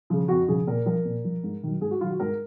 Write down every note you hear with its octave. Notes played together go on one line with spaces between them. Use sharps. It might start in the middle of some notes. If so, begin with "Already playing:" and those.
C#3 F3
F2 F#4
C#3 F3 G#4
A#2 A#4
F3 A#4
A#2
F3
G#2
D#3 F#3
G#2 G#4
F#4
D#3 F#3 F4
F#4
G#2 A#4